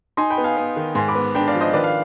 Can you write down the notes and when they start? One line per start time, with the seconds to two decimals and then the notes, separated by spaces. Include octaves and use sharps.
0.17 D#4 G#5 C6
0.30 G5 B5
0.38 B3
0.44 F5 G#5
0.57 B3
0.76 D#3
0.95 G#2 G#5 C6
1.08 B5 D6
1.15 B3
1.35 D4 G5 B5
1.48 D5 F5
1.54 F3
1.60 C5 D#5
1.73 D#3 B4 D5
1.84 F5